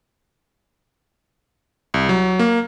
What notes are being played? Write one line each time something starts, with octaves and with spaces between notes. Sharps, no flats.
C2
F#3
A#3